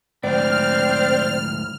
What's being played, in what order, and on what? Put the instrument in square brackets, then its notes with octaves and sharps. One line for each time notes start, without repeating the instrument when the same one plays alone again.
[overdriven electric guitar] D2 G#2 [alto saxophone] C4 [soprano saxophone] D5 [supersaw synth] F6